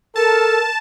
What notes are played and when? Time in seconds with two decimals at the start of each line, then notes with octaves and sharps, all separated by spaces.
0.16 A4 A#4 A5